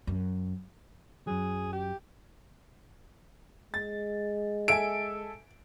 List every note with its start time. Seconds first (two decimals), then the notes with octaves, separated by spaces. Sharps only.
0.07 F#2
1.27 F#2 F#3 G#4
1.73 G4
3.74 G#3 A6
4.68 A4 E5 G#5 D7